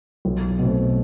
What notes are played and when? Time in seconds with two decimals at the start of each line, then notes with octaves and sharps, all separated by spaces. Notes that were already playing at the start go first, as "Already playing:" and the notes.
0.25 B1
0.59 B2 A3 C4